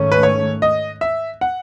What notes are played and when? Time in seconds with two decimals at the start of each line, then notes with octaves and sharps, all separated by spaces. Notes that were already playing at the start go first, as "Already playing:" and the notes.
Already playing: G#2 D#3 A3 C#4
0.12 B4
0.23 C#5
0.62 D#5
1.01 E5
1.41 F#5